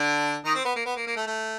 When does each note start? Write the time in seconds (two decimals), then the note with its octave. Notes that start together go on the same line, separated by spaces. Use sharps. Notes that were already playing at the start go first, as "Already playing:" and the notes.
Already playing: D3 D4
0.45 D#3 D#4
0.55 C4
0.65 B3
0.76 A#3
0.86 B3
0.96 A#3
1.07 A#3
1.16 A3
1.27 A3